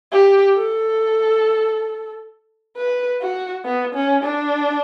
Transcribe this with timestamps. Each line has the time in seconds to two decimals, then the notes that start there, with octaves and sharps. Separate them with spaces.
0.12 G4
0.56 A4
2.76 B4
3.21 F#4
3.65 B3
3.95 C#4
4.23 D4